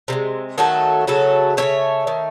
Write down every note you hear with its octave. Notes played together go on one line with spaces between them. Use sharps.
C3 D#3 G#3
D#3 F#3 A3 F#4 A4
C#3 F#3 A3 F#4 A4
F#3 A3 C#5 E5
C#3
D#3 A3